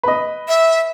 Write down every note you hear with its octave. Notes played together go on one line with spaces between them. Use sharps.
B4 D#5
E5